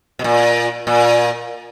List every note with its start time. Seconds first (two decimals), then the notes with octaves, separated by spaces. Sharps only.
0.19 B2
0.24 A#2
0.87 A#2